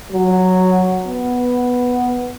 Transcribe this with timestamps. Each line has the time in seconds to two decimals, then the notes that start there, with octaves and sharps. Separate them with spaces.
0.11 F#3
1.06 B3